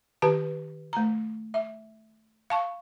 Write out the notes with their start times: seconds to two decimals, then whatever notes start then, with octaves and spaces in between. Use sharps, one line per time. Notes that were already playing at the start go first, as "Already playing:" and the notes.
0.22 D#3 G4 B4 A5
0.93 A3 A#5
1.54 E5
2.50 F5 A5 C#6